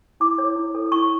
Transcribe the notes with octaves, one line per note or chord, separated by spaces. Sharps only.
E4 D6
A4 C#5
E4
A4 C#5
E4 C#6